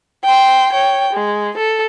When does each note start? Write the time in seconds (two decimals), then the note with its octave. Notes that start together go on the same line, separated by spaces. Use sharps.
0.24 G5 C6
0.72 C#5 G5
1.13 G#3
1.57 A4